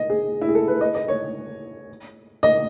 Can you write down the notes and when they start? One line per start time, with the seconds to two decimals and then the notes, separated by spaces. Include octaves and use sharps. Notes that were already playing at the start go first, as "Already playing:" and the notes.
Already playing: D#5
0.10 G#4
0.41 E4
0.49 G#4
0.55 A4
0.68 B4
0.81 D#5
0.95 D#5
1.08 C#5
2.43 D#5